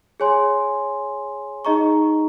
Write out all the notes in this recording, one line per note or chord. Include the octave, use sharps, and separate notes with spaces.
G#4 C#5 G#5 C6
D#4 G#4 D#5 A#5 C#6